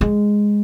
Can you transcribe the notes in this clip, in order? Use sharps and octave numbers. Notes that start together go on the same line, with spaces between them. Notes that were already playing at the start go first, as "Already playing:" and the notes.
G#3